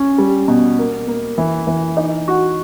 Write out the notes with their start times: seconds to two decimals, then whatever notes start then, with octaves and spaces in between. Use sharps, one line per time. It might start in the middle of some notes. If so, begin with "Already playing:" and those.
Already playing: C#4
0.18 G3
0.48 B2
0.79 A#3
1.08 A#3
1.38 E3
1.67 E3
1.97 D#4
2.28 F#4